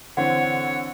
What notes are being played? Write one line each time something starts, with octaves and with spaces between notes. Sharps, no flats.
D3 E3 C4 C#5 F#5